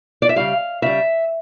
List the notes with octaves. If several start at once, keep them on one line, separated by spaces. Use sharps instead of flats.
D5
E5
C#3 G3 F5
C#3 G3 E5